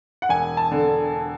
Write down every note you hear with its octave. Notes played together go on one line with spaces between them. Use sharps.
F#5
E1 G#5
A5
D3